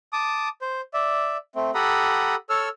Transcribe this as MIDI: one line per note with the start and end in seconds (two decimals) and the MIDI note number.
0.13 0.49 81
0.13 0.49 86
0.13 0.49 87
0.62 0.81 72
0.94 1.37 74
0.94 1.37 76
1.55 1.71 57
1.55 1.71 60
1.75 2.35 67
1.75 2.35 69
1.75 2.35 78
1.75 2.35 82
1.75 2.35 83
1.75 2.35 87
2.50 2.69 69
2.50 2.69 73
2.50 2.69 88
2.50 2.69 89